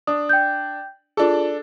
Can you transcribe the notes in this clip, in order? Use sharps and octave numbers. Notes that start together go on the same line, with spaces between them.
D4 D#6
G5 G6
D4 F4 G#4 A4